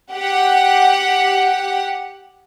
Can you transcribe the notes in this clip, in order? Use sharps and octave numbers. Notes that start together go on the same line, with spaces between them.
G4 F#5